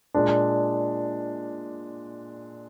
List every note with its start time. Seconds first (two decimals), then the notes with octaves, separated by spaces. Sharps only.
0.14 A#2 G#3 D4